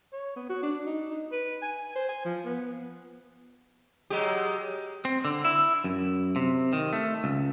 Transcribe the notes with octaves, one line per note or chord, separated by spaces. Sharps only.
C#5
B3
F#4
D4
D#4
D#4
B4
G#5
C5
G#5
F3
B3
F#3 G#3 G4
C4
D3
E4
F#2
C3
D#3
A3
C#2